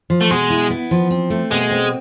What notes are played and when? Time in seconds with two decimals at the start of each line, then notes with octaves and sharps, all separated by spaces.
0.10 F3
0.21 A3
0.31 B2 G#3
0.50 E4
0.70 B3
0.91 F3
1.10 C4
1.30 A3
1.51 B2 G#3
1.71 C4